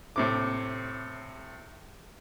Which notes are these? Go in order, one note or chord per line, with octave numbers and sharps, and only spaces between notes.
A2 C3 D6